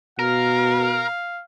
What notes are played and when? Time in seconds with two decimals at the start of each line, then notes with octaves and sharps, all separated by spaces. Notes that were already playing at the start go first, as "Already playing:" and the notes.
0.19 B2 A#4 F5